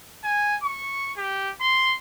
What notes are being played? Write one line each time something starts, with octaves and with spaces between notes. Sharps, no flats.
G#5
C#6
G4
C6